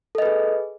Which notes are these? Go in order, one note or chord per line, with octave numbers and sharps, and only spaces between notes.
G#4 A4 B4 D#5